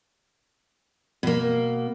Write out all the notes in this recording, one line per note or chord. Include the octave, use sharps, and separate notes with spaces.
B2 A#3